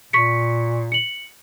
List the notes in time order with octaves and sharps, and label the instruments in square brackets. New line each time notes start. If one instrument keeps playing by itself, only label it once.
[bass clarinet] A#2 [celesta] C#6 B6 C#7
[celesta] C#7 F#7